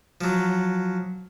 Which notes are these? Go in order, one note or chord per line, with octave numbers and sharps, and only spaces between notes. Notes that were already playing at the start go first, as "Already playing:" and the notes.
F3 F#3